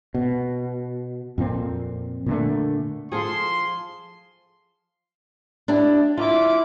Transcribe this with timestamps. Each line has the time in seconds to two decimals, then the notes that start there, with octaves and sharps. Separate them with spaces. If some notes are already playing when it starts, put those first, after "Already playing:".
0.14 B2
1.38 F2 A#2 C4
2.26 A#2 D3 A3
3.12 F3 F4 G#4 A4 C6
5.68 D4 E4 G4
6.17 E4 F4 D6